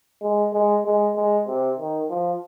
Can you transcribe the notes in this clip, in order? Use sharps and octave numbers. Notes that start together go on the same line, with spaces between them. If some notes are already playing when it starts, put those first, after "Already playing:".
G#3
G#3
G#3
G#3
C3
D#3
F3